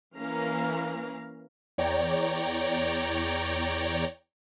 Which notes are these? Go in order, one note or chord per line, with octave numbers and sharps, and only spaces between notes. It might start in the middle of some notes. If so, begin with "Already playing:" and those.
E3 A#3 C#4 A#4 F5 A#5
E2 C#5 D5 G5 A#5